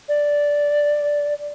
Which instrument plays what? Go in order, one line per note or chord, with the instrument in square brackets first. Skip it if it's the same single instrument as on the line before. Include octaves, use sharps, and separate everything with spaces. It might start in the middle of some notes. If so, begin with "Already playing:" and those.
[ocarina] D5